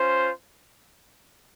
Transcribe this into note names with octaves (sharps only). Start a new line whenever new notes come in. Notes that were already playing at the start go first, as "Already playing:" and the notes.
Already playing: C#4 F4 C5